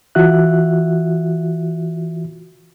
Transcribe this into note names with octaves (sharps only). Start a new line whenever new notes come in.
E3 F4 F#4 E5 F#6